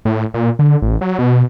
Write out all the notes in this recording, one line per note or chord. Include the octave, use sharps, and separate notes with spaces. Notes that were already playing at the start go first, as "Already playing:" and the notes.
A2
A#2
D3
A1
F#3
B2